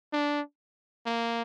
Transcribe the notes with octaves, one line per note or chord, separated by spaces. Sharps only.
D4
A#3